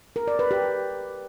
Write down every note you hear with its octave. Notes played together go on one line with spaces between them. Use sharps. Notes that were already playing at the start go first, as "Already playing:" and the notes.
A#4
D5
B4
G4